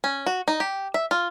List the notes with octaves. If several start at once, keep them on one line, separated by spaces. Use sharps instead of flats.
C#4
F#4
D#4
G4
E5
F4